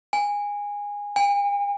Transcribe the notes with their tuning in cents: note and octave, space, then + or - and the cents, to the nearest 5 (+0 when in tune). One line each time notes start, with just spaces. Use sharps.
G#5 -20
G#5 -45